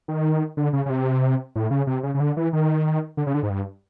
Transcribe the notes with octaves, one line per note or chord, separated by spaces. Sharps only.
D#3
D3
C#3
C#3
C3
A2
C#3
C3
C#3
C#3
D3
E3
D#3
D3
C#3
D3
G#2
G2